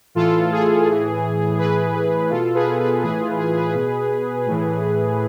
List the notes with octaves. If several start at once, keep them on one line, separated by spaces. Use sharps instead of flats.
A2 E3 F4 A4
G#4
A2 E3
A2 E3 G#4 B4
G#4
B2 F4 A4
G#4 B4
G#4 B4
A2 E3 G#4 B4
F4
G#4
G#4 B4
B2
A2 E3